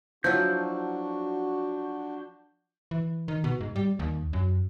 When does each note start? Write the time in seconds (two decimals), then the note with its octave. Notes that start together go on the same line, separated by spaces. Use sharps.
0.24 F3 F#3 D4 E4 F#4 G6
2.91 E3
3.28 D#3
3.44 B2
3.61 G#2
3.76 G3
3.99 D#2
4.33 F#2